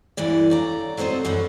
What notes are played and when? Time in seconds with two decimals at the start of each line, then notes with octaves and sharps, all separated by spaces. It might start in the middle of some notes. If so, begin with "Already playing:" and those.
0.17 D2 G2 D3 E3 D5
0.50 C#3 D5 A#5
0.97 F#3 C4 A4 C5 D#5
1.25 F#2 D3 F#4 B4